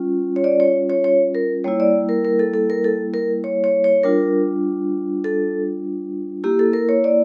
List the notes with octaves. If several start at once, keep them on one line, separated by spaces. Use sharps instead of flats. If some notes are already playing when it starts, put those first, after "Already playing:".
Already playing: G3 C#4 F4
C#5
D5
C#5
C#5
C#5
A#4
G3 A#3 E4 C#5
D5
A#4
A#4
A4
A4
A#4
A4
A#4
C#5
C#5
C#5
G3 D4 F4 A#4
A4
A#3 E4 G4
A4
A#4
C#5
D5